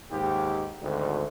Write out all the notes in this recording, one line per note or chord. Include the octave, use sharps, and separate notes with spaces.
D#2 G#2 G4
G#1 D2